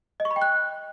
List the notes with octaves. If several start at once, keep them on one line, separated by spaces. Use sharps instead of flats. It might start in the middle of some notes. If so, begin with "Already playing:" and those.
D#5
C#6
B5
G5
F#6